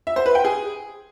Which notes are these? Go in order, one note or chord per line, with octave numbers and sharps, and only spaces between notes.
E5
C5
B4
G5
G#4